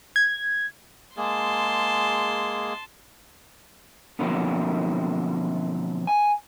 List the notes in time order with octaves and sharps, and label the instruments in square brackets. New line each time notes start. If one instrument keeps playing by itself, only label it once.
[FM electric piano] G#6
[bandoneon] G#3 A#3 G#4 [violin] A5 C6
[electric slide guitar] B2 D3 F3 F#3 A#3 C4
G#5